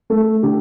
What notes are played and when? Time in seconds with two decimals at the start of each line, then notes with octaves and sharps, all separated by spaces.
0.10 A3 A4
0.43 D3 G4